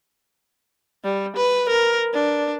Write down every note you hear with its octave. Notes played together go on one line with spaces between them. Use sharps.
G3
B4
A#4
D4